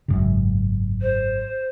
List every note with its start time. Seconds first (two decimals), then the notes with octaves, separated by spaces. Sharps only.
0.08 G#1 F#2 C#3
1.02 C5